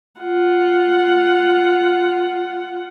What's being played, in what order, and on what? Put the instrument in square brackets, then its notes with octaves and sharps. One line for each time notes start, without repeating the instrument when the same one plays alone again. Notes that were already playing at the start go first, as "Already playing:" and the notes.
[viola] F4 F#5